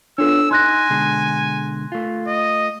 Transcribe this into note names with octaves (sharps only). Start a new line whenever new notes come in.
B3 D4 F4 A4 C#5 E6
D#4 G#5 C6 F#6 A#6
B2 D3 G#3
A3 F4
D#5